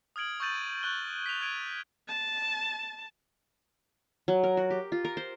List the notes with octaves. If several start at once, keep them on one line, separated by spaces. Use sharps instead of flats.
D#6 F6 G#6 D7 F#7
C#6 E6 G6 A6 D#7 F#7
C#6 F#6 G6 G7
B6 F7
F#6 G#6 D7 D#7
A5
F#3
A#4
F#4
G4
F4
A#4
C5